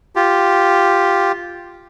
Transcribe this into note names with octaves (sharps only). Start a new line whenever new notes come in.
F4 G4